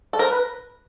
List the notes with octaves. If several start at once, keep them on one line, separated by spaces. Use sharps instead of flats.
A4
A#4 C5
B4